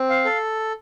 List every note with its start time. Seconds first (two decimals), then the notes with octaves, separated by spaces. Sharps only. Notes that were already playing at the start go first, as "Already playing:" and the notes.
Already playing: C4
0.10 F5
0.25 A4